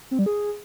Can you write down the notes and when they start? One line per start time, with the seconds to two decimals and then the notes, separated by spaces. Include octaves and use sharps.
0.11 C4
0.19 G3
0.26 G#4